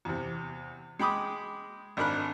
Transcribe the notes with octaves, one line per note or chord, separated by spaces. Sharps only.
E2 C3
G#3 G5 B5 D6 D#6
G#1 D4 A#4 B5 F#6